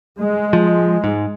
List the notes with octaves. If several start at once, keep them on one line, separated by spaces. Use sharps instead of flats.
G#3
F3
G#2